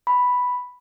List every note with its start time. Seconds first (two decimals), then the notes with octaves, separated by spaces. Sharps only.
0.07 B5